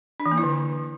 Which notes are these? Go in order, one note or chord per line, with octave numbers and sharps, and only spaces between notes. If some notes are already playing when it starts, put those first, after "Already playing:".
D4
E3
A#3
E4
D3